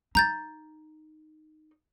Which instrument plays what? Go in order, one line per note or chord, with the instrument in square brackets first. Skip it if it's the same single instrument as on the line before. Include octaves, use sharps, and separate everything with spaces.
[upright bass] D#4 [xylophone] A#5 G6 A6